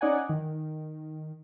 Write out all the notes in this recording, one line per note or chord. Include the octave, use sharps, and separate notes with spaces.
C#4 D#4 D5 F#5 G#5
D#3